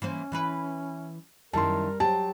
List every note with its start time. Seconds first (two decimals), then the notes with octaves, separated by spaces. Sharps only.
0.02 E3 A#3 C#4 C5
0.32 E3 E4 B4
1.53 F#2 D#3 G3 E4 A#4 A5 C6
2.00 F#3 G4 C5 A5